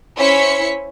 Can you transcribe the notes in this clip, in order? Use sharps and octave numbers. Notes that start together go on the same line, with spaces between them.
C#4 E4 C5 B6 C#7